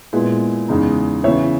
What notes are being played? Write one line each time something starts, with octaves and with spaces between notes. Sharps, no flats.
A#2 G#3 B3 E4
E2 C#3 G#3 D#4
C#3 E3 B3 C#5 E5